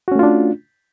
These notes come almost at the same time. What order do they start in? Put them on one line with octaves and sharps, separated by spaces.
F#4 C#4 A3 F4 D4